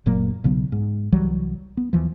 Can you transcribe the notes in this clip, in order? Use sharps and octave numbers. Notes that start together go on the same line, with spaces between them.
F#1 A#2 F#3 A#3
B1 C#3 F#3 B3
G#2
C2 E3 F#3 G3
B3
D#2 E3 F3